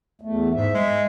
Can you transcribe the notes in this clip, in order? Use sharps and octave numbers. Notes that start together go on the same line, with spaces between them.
E2 A3
G#2 E5
G#3